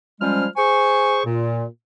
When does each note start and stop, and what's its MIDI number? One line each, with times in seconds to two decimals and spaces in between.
0.21 0.46 53
0.21 0.46 55
0.21 0.46 56
0.21 0.46 61
0.21 0.46 72
0.21 0.46 89
0.57 1.19 68
0.57 1.19 72
0.57 1.19 80
0.57 1.19 85
1.25 1.64 46